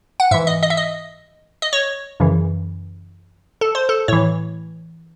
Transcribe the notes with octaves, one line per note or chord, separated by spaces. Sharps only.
F#5
G#2 E3 E5
D#5
D#5
E5
D#5
D#5
C#5
F#2 C#3 E3
A4
C5
A4
A2 E3 C#5